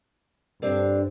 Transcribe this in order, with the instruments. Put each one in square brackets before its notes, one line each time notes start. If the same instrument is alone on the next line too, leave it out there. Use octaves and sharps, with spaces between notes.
[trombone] G2 [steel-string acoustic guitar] D3 C4 D4